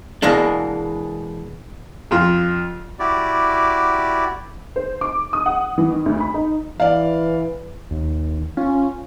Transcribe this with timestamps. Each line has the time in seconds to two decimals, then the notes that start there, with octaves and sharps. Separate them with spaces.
0.22 B2 E3 G#3 A#3 D4
2.11 F2 F4
2.99 E4 F#4 G4 D5
4.76 C5
5.01 D6
5.33 D#6
5.46 F#5
5.78 E3
5.90 D#3
6.06 D2
6.20 B5
6.34 D#4
6.80 E3 D5 F5
7.91 D#2
8.57 C#4 F4